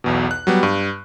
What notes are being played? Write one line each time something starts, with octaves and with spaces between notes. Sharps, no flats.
B1 E2 B2
F#6
F#3 G3 B3
G2